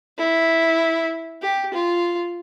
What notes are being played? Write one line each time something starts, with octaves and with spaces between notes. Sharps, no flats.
E4
G4
F4